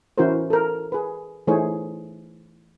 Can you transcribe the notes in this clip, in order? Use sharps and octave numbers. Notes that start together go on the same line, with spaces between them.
E3 C#4 E4 F#4 A#4 C5
A4 A#4
G#4 B4
E3 A3 D#4 G#4 C5 C#5